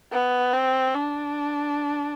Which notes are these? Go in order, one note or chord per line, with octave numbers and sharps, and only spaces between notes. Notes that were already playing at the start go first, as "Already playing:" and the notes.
B3
C4
D4